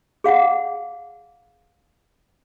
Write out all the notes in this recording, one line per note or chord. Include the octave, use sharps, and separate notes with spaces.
G#4 F5 F#5